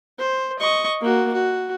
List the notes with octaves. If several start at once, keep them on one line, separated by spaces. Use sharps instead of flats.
C5
D#5 C#6
A#3 F#4
F#4